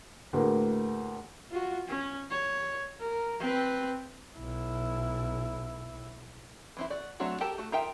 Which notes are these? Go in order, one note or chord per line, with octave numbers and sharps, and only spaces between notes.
D2 A2 A#3 G#4 A#4 B4
F4 F#4
C#4
C#5
A#4
C4 B4
B1 E4
E3 C4 E4
F#4 D5
F#3 A3 C4 D4 F#4
G4 A4 A#4 A5
A3 F#4 A4
D#4 F4 A#4 E5 G5